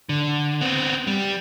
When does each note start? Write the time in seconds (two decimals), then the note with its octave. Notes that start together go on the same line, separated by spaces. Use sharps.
0.09 D3
0.61 B3 C4
1.07 G3